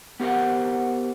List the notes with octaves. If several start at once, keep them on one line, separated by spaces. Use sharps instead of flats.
B3 G4 A#4 C5 F#5